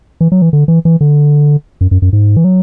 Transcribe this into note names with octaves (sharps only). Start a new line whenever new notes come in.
E3
F#3
E3
D3
E3
E3
D3
F#2
F#2
F#2
G#2
E3
F#3